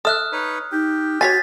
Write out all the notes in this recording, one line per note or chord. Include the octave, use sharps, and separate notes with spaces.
A4 E5 D#6 F6 F#6
D#4 B4 C#5
D#4 G4
F#4 C#5 F5 G#5 A6 B6